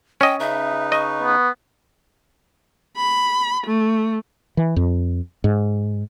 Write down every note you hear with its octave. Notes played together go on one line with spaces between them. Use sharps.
C#4 D#5 G5
C#3 D#4 B4 E5
D#5 C#6
B3
B5
A3
E3
F2
G#2